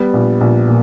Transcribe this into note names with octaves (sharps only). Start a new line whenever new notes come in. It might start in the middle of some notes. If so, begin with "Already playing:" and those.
Already playing: G3 B3
A#1
A#1
A#2